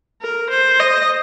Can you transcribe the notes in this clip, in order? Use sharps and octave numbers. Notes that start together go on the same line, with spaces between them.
A#4
C5
D#5